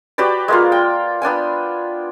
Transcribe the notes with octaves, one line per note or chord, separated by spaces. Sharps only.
F#4 G4 B4 D5
G#3 A#3 F4
G5
B3 D4 G5 G#5